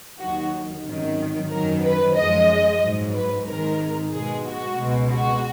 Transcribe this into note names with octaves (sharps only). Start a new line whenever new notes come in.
D#2 D#3 F#3 F#4
G#1 F#2 D#3 F#3
F#2 D#3 F#3 A#4
B4
F#2 F3 G#3 D#5
A#1 G#2 F#3
B4
G#1 G#2 D#3 G#3 A#4
B1 B2 G#3 G#4
F#4
C#2 B2 G#3
F#4